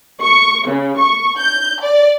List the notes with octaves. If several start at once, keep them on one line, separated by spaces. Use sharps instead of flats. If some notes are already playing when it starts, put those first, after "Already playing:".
C#6
C#3
C#6
G6
D5